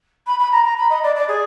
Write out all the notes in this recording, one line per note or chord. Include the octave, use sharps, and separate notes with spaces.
B5
B5
A#5
A#5
B5
D#5
D5
D5
G#4